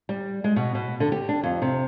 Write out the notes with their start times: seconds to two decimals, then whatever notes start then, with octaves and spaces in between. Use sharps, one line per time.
0.09 G3
0.44 G#3
0.56 B2
0.75 B2
1.00 D3
1.12 G4
1.29 D4
1.43 F2
1.62 C3